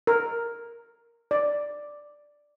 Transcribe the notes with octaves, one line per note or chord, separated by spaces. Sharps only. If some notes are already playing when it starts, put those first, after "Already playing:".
A#4
D5